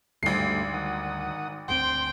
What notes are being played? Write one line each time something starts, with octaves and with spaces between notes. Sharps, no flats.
G#1 D2 G2 G3 A3 C7
D#3 F#5 D#6
G1 D2 C4 G5 C6